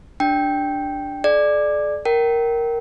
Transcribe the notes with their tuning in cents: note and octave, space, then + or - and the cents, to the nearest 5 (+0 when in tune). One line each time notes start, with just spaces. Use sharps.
D4 +0 G4 +5 G5 +0
G#4 +45 D5 +15
A#4 +0 G5 -25